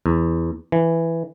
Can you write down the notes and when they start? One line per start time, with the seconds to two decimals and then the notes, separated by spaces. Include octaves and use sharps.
0.06 E2
0.72 E3